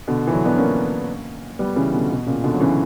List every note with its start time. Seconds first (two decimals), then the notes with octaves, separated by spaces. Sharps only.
0.08 B2 D3
0.27 E3
0.33 D3 F#3
0.45 B3 D4
0.58 A#3 C#4
1.59 G3 B3
1.76 C#3 E3
1.93 B2 D3
2.10 B2
2.27 A#2 C#3
2.44 B2 D3
2.53 F#3
2.60 C#3 E3